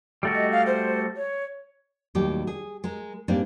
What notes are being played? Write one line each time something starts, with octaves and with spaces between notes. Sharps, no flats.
G3 A3 F#4
D#5
F5
C5
C#5
D#2 A2 F#3 G3 G4
G#4
G#3 A#4
G#2 G3 A#3 C4 D4